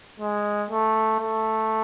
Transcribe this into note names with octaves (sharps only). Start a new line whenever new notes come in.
G#3
A3
A3